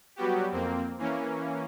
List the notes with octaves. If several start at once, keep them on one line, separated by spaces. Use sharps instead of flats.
F#3 G3 B3 F#4 G4
F2 A#3 C4
E3 A#3 C#4